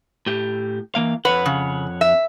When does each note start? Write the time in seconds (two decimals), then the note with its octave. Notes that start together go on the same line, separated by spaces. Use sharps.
0.26 A2 G4
0.95 E3 A#3 F5
1.25 F2 B4 C#5 F#5
1.46 C#3
2.01 E5